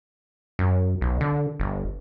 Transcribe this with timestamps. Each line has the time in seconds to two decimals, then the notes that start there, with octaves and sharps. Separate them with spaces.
0.59 F#2
1.01 B1
1.21 D3
1.60 G1